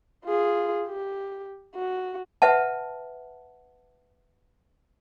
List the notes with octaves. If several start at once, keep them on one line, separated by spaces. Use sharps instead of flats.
F4 G#4
G4
F#4
B4 E5 F#5 A5